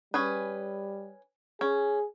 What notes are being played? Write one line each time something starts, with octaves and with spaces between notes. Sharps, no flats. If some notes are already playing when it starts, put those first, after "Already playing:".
G3 C#4 G#4 B4
C#4 G#4